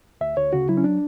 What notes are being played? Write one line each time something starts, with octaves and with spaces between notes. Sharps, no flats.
D2 E5
D2 C#5
C#3 F#4
F#3 E4
C#4
D4